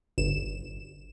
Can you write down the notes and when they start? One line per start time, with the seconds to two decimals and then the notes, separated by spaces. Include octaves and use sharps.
0.18 G1 E7